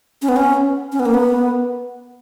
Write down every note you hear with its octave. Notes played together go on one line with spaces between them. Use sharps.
C#4
B3
C#4
C#4
B3
A#3
B3